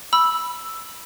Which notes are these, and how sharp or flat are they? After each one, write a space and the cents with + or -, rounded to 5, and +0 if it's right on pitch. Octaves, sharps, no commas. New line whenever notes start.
B5 -10 E6 +0